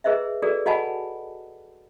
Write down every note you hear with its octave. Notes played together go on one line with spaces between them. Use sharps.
G#4 B4 C5 D#5 E5
F#4 G#4 A4 B4 D5
F#4 D#5 F#5 G#5 A5 B5